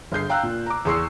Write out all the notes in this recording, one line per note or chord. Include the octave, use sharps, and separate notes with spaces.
G1 G#4 G6 C7
F5 G5 A#5 E6 F#6
A#2
A#5 D6
E2 G#4 C6 C#6 E6 C7